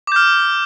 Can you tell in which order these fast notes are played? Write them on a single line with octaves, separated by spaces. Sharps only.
D6 G6 F6